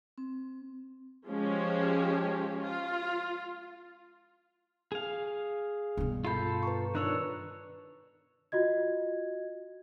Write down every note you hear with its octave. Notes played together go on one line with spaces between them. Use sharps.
C4
F3 G#3 C#4 G4
F4
G#4 F5
G2 B2
F4 A4 B5 G6 C7
B4 A#5 C#6
D#3 D4 B4 C#5 E6 F#6
F4 F#4 D#5 G#6